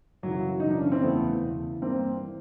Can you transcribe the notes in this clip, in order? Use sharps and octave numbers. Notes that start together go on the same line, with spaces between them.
F#2 C#3 E3 F#3
F#2 C#3 E3 D#4
D4
C#4
C4
E2 C#3 E3 A3 B3
E2 C#3 E3
G2 E3 A#3 C4
E3